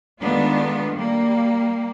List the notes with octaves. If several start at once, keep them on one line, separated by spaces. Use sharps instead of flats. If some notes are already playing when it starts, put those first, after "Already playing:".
D#3 G#3 A3 B3 D4 F4
G3 A#3